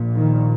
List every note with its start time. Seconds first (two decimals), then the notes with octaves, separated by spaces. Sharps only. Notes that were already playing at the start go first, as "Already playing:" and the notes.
Already playing: A#1 A#2
0.15 D#3